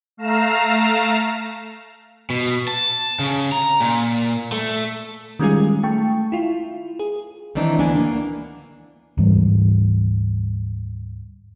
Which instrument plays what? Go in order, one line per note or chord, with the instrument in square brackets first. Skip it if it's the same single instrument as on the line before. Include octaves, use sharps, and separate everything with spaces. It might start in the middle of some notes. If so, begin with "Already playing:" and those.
[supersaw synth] A3 F5 A#5 E7
[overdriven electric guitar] B2
A5
C#3
A#5
A#2
A3
[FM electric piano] D#3 G3 G#3 C#4 F4 G#4
A3 G5 A5 C#6
E4 F4
G#4
[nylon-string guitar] D#3 E3 C4 D4 D#4
D2 E3 B3 D4 G#5
A#3
[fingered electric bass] D2 G#2 E3 G3